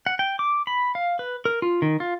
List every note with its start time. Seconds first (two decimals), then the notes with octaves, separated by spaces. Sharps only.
0.06 F#5
0.19 G5
0.39 D6
0.67 B5
0.95 F5
1.19 B4
1.45 A#4
1.62 F4
1.82 D#3
2.00 F4